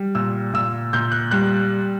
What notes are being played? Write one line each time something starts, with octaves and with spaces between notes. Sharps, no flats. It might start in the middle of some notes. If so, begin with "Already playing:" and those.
Already playing: G3
A#2 E6
A#2 E6
A#2 G6
F#6
G3 F#6